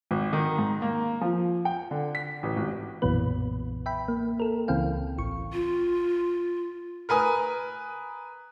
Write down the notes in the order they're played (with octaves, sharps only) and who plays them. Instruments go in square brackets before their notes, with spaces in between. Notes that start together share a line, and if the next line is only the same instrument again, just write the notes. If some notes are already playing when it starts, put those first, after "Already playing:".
[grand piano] G#1
D#3
G#2
A#3
F3
G5
D3
B6
A1
G#1
[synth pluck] B1 F#2 A#2 E3 B3 B4
E5 G5 B5
A#3
A4 A#4
C#2 C#3 E3 C4 F5 G5
A1 C#6
[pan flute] F4
[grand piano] A#4 B4 G#5 D#6